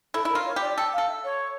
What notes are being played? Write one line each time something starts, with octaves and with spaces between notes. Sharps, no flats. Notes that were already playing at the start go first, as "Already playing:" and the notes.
E4 A4
E4
A#4
F4
C#5
G4 D5
A4 G5
F5
A4
E5
C#5